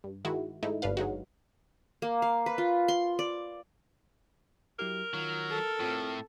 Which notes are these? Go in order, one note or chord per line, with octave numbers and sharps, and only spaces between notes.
G2
D#3 G#3 E4 F#4
G#2 A3 D#4 E4
G1 G2 D4 B4 F5
F#3 G#3 D#4 F#4
A#3
F5
B4
F4
C6
D5
F#3 E4 G4 A#4
D#3 F#3 F4
A4
A2 C4 F4